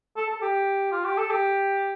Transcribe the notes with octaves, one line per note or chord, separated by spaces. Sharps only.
A4
A4
G4
F4
G4
A4
G4